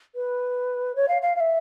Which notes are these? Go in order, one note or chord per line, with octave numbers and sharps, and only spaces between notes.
B4
C#5
F5
F5
F5
E5